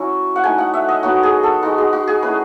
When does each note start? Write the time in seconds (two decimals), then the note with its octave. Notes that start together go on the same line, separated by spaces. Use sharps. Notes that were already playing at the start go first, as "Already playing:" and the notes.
Already playing: F#3 C#4 E4
0.36 F#5
0.44 A3 D#4 G#5
0.58 F#5
0.74 E5
0.89 D#5
1.03 F#3 B3 D#4 F#4
1.23 G#4
1.43 A4
1.63 G#3 D#4 F#4
1.78 G#4
1.93 F#4
2.07 G#4
2.23 A3 C#4 E4 B4